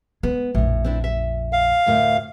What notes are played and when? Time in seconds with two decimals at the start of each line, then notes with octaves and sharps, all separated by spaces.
0.23 G#3 B3
0.55 A#1 F2 A2
0.84 C4 D4 E4
1.04 E5
1.53 F5
1.86 D2 A2 A#4